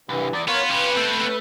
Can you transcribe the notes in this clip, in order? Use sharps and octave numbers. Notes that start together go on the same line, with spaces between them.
C2 G2 E3
E2 D5
B3 F4 A#4 C#5
C#4 G4 B4
A3 B3 C4